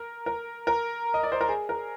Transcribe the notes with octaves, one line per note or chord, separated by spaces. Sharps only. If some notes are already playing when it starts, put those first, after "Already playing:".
Already playing: A#4
A#4
A#4
D#5
D5
C5
A#4
G#4
A#4